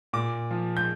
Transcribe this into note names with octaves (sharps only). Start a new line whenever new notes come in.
A#2 D6
F3
G6